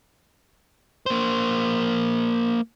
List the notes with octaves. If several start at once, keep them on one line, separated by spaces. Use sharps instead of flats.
A#3 C5